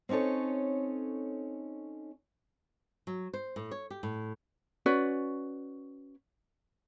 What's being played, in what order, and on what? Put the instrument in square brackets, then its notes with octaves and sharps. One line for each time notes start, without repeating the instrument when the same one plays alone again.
[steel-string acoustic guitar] C4 C#4 D#4 A4 C#5
[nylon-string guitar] F#3
C5
A2
C#5
G4
A2
[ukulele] C#4 F#4 B4 D5